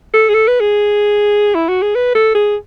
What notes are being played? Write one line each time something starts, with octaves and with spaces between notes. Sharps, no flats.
A4
G#4
A4
B4
G#4
E4
F#4
G#4
B4
A4
G#4